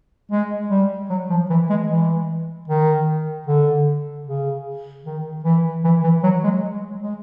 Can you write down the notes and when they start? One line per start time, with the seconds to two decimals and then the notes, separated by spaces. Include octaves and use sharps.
0.31 G#3
0.70 G3
1.10 F#3
1.30 F3
1.50 E3
1.70 G#3
1.89 E3
2.68 D#3
3.47 D3
4.27 C#3
5.05 D#3
5.44 E3
5.84 E3
6.04 E3
6.23 F#3
6.44 G#3
7.02 G#3